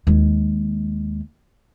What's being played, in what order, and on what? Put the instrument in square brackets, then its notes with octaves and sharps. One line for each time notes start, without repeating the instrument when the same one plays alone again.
[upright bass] D#2 G#3